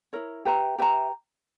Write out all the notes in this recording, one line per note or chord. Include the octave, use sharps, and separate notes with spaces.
E4 A#4 C#5
G4 B4 E5 A#5
G4 B4 E5 A#5